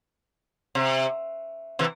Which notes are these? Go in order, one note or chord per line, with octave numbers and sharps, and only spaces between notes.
C3
C3 E3